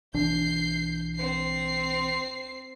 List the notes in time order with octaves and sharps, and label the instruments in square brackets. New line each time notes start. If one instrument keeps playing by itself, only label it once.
[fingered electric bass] B1 E3 D4 [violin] G6 C7
[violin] C4 C7